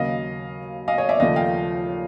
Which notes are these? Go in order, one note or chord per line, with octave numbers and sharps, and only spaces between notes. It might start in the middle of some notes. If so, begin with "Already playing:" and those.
Already playing: D#2 C#3 F#3 A#3 D#5 F5
D#5 F5
C#5 D#5
D5 E5
D#2 C#3 F3 A3 D#5 F5
F5 G5